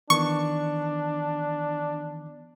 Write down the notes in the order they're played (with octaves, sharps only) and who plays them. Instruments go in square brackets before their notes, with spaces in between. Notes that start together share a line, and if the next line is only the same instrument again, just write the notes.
[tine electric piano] D#3 E3 B3 [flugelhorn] D4 [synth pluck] C#6